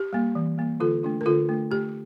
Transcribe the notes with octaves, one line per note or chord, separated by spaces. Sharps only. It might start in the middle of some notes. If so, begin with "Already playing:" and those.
Already playing: G4
G3 A#3
E3
G3 A#3
D3 F4 A4
A3 D4 F4
A#4
D3 F4 A4
A3 D4 F4
A3 G4